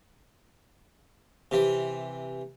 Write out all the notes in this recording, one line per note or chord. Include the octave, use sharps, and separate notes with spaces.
C3 E3